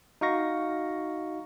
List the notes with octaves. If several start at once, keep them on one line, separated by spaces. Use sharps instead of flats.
D#4 F#4 F5 C#6 A#6